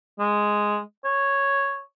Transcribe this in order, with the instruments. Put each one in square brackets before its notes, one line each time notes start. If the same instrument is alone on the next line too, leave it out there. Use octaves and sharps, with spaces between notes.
[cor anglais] G#3
C#5